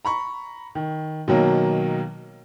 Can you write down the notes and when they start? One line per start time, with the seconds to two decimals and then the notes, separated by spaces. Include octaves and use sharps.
0.05 A#5 B5 C#6
0.75 D#3
1.28 B2 D#3 F#3 A#3